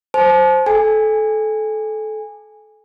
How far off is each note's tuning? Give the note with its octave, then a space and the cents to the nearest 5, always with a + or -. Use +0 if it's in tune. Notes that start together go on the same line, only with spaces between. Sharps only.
C5 +0 A5 -40
A4 -25 G#5 -20